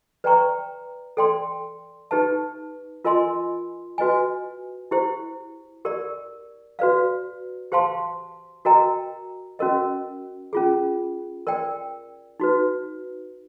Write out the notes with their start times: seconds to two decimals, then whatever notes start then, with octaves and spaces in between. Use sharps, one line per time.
0.24 B4 D5 G5 A#5 C#6
1.17 A4 D5 G5 C6
2.11 D#4 G4 B4 E5 A5
3.05 F4 A#4 D#5 G#5 C6
3.98 F#4 B4 D#5 G#5
4.91 E4 G4 C5
5.85 G4 A#4 D5
6.79 F#4 B4 D5 F5
7.72 G4 C5 F5 A5 C6
8.65 F#4 A#4 D#5 G5 A#5
9.59 C#4 F#4 A#4 D#5
10.53 C#4 F4 G#4
11.47 A#4 D5 G5
12.40 D#4 F#4 B4